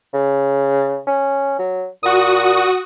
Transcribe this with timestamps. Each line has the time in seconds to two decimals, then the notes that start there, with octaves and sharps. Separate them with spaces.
0.14 C#3
1.07 C#4
1.59 F#3
2.03 A#2 F#4 D#6